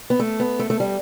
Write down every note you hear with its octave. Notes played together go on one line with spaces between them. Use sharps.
B3
A3
B3
A3
A3
G3